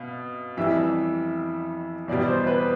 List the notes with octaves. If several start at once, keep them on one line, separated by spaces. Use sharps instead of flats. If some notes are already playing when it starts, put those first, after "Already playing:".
Already playing: B2 F5
F2 E3 G3 E5
E2 B2 G3 D5
C5
B4